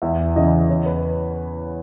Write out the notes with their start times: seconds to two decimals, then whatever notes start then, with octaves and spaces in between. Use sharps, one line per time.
0.02 E2 E5
0.36 C#3 E3 D#5
0.69 E2 C#5
0.86 B4